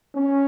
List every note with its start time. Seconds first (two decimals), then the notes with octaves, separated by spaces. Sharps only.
0.15 C#4